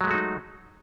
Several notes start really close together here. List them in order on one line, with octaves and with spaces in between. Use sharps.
F#3 G#3 A3 F#4 D#4